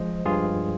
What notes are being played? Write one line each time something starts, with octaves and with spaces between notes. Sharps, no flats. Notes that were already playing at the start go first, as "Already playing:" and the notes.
Already playing: F3 G#3 C5 D#5
G2 F4 G#4